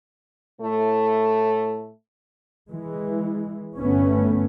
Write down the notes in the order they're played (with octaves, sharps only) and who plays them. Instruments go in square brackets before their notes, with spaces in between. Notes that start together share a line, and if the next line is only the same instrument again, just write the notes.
[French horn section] A2 A3
[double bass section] E3 G#3
G1 A3 B3 C#4